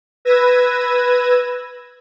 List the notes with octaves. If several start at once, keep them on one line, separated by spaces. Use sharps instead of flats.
B4 E6 G#6 A#6 D#7